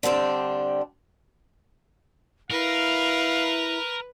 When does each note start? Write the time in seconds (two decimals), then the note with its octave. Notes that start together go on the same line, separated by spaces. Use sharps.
0.03 D3 G3 C4 D4
2.51 E4 A#4 B4 F5